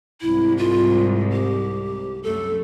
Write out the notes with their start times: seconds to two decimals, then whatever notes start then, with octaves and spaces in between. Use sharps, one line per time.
0.21 C2 G#2 E4
0.57 F4
1.32 G4
2.23 F#2 A3 A4